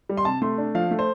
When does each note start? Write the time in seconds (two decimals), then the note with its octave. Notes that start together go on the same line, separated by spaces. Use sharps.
0.09 G3
0.17 C6
0.25 C3 A5
0.42 A3 C6
0.58 D4
0.75 F3 F5
0.91 A3
0.99 C5